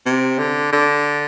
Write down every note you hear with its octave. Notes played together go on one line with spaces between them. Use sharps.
C3
D3
D3